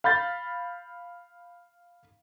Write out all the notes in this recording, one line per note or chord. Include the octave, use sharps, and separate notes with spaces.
F5 B5 G6 A6